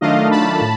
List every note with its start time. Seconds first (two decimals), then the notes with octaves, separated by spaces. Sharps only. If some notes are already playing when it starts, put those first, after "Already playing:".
0.01 D#3 F#3 A3 D4 F4 D#5 F5
0.31 A5 B5
0.61 A2